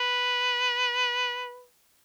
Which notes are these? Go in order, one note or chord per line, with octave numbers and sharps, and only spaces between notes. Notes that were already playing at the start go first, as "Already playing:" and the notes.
Already playing: B4